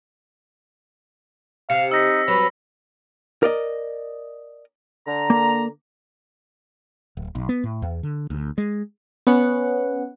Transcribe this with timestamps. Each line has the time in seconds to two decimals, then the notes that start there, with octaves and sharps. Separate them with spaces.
1.70 C3 F5 C#7
1.91 D#4 E6 A#6 B6
2.28 F#3 B4 A#6
3.43 A#4 D5 D#5
5.07 D3 A#5
5.30 A#3
7.17 D1
7.35 B1
7.49 B3
7.64 A2
7.82 E2
8.03 D3
8.30 D2
8.58 G#3
9.27 B3 C#4 F#5